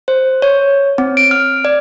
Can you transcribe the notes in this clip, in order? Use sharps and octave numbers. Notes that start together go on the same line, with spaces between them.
C5
C#5
C4
D7
F6
D5